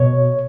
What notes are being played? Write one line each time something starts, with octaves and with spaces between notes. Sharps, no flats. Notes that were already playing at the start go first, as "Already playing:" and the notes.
Already playing: B2 C#5